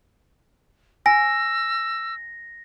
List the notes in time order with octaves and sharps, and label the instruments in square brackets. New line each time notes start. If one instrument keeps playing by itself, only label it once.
[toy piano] G#5 [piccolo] E6 [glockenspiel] A#6